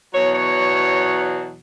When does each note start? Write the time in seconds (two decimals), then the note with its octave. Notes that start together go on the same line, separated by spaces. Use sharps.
0.12 E2 B2 F#3 C#5
0.35 C#5